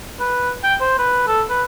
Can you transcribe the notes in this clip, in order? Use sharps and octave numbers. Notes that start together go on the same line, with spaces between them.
B4
G5
C5
B4
A4
B4